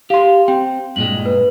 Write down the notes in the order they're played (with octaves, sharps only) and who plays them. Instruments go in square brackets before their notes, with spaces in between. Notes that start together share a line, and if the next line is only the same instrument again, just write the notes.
[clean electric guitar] G4 C6 [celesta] F5
[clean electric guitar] C4 [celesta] G5
[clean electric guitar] G2 A#2 G#3 [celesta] F#7
[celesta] B4